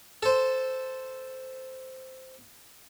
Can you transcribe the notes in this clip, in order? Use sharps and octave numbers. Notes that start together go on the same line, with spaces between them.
A4 C5